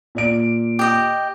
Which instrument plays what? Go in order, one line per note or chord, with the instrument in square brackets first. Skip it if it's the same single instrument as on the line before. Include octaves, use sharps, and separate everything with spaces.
[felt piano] A#2 D5 D7
[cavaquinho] G4 D#5